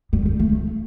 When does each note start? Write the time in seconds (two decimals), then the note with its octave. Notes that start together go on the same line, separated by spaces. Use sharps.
0.13 G3
0.26 G3
0.39 A3
0.52 A3